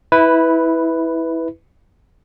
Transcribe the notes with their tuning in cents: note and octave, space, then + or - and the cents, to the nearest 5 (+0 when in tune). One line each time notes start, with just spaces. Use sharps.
E4 -15 B4 +5